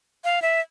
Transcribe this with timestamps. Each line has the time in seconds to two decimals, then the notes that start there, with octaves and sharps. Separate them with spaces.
0.24 F5
0.42 E5